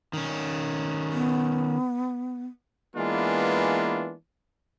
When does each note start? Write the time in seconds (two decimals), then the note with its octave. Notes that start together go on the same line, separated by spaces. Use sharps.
0.13 D#3 C#4
1.12 B3
2.96 E3 G#3 A#3 B3 D4 F4